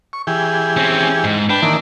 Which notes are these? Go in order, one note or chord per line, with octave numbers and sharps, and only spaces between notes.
C#6
E3 G4 G#4
C4 C#4
G#2
D4 B4 G5
D#3 E3 A#3